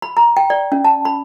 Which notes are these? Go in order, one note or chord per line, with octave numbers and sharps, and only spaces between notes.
B5
A#5
G5
D5
C#4
A5
B5